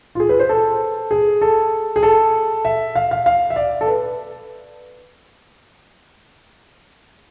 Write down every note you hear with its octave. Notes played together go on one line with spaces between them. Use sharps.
F4
G#4
B4
C5
A4
G#4
A4
G#4
A4
E5
F5
F5
F5
E5
D5
A4
B4